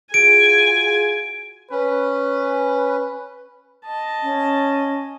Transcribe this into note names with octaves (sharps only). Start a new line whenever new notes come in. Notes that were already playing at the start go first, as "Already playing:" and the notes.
F4 F#4 G#4 G#5 D7
C#4 B4
D#5 A5
C#4